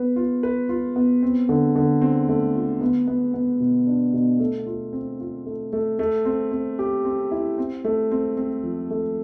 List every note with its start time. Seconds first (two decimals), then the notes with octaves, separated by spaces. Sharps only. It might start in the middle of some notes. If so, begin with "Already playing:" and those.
Already playing: B3 B4
0.16 F4
0.43 B4
0.69 F4
0.96 B3
1.22 C4
1.49 D3
1.76 D3
2.02 C4
2.29 A3
2.55 F4
2.81 B3
3.08 B3
3.34 B3
3.60 B2
3.87 D4
4.13 B2
4.40 A3
4.66 F4
4.93 C4
5.20 F4
5.46 A3
5.73 A3
5.99 A3
6.25 C4
6.52 C4
6.79 G4
7.05 C4
7.31 E4
7.58 C4
7.84 A3
8.11 C4
8.37 C4
8.63 F3
8.90 A3